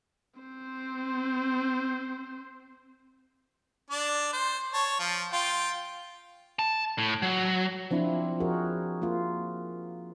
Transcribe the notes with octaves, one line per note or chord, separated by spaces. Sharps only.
C4 C5
D4 D5
C5
C#5 A5
F3
F4 G5
A5
A2
F#3
F3 C4 D4 E4 F4
F3 F#4 G#4 A#4
A#3 F4